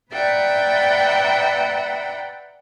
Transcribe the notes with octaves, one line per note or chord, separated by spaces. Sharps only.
B4 D5 E5 F#5 G5 A#5